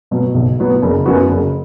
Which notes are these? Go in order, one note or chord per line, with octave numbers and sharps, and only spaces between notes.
B2 F#3 B3
B1
B2 F#3 B3
F#1
F#2 F#3 B3 F#4
F#1